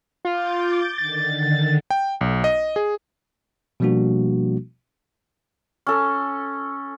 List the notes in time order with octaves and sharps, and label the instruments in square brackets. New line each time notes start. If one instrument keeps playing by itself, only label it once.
[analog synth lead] F4 [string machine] D6 G6 A6
[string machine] D3 D#3 [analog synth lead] A6
[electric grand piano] G5
B1
D#5
G#4
[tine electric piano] B2 F3 G3 A#3 D4 F#4
[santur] C#4 A4